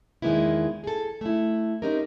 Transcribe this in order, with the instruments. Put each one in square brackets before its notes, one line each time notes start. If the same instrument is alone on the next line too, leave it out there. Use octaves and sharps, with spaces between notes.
[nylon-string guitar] E2 D#3 G#3 A#3 B3 E4
G#4 A4
A3 E4
C4 C#4 D#4 G4 A#4